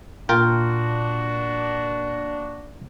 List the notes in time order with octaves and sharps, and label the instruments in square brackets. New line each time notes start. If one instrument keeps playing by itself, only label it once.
[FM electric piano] A#2 [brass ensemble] A#3 D4 [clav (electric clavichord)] F4 A#4 G5 [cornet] F#4